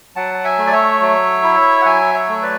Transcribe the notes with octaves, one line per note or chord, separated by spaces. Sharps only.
F#3 F#5 A5
A5
E5 G#5
A3
D5
C#5 E5
F#3
E4
F#5
F#3 E5 G#5
C#5 E5
A3
B4 D5